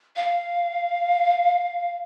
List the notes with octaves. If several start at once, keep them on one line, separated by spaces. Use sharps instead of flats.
F5